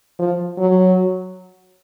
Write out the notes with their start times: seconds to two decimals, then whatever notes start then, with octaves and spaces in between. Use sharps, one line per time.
0.19 F3
0.58 F#3